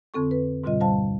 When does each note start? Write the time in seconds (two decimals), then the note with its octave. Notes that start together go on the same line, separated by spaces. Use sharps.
0.14 F2 D3 C4 A4 C#6
0.31 B4
0.64 G#2 B2 D3 G3 F4 D#5
0.81 D2 G3 C5 F5 A5